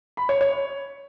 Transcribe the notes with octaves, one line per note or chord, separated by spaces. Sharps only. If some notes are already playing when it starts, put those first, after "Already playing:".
B5
C#5
C#5